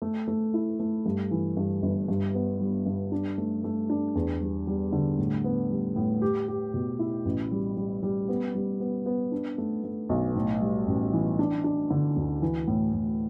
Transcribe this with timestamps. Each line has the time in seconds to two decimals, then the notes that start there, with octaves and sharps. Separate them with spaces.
0.02 A3
0.28 A3
0.54 E4
0.80 A3
1.06 G2
1.31 E3
1.57 G2
1.82 G1
2.08 G2
2.34 B3
2.60 G3
2.86 G2
3.12 D4
3.38 A3
3.64 A3
3.89 D4
4.15 E2
4.41 G3
4.67 G3
4.93 D3
5.19 A2
5.44 B3
5.70 G3
5.96 A2
6.22 G4
6.48 G4
6.74 B2
6.99 E4
7.25 A1
7.51 G3
7.77 G3
8.03 G3
8.28 B3
8.54 G3
8.80 B3
9.06 B3
9.32 D4
9.58 A3
9.84 A3
10.09 B1
10.35 A2
10.61 G3
10.87 A1
11.13 E3
11.39 D4
11.64 D4
11.90 D3
12.16 D2
12.42 E3
12.68 A2
12.93 A2